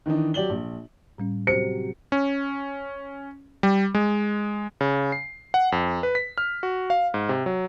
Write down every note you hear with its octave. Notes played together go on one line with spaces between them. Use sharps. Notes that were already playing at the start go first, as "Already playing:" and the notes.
D#3 E3 D4 D#4
F#3 G4 D5 F#7 G7
A#1
A2 G3 C#4
C3 F#3 C5 C#7
C#4
G3
G#3
C#3
C7
F#5
F2
B4
B6
F6
F#4
F5
G#2
C3
F#3